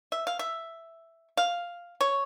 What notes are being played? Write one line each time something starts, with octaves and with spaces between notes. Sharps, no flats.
E5
F5
E5
F5
C#5